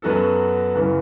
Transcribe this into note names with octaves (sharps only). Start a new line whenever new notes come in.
F#2 F#3 B3 F#4 A4
F#2 C#3 E3